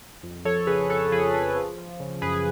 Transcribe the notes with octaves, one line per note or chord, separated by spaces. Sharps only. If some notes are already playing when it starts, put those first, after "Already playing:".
F2
F3 A4 C#5
A4
C#3 G#4 B4
F2 A4 C#5
F3 G#4 B4
F3 G#4 B4
F3
F3
C#3
F#2 G#4 B4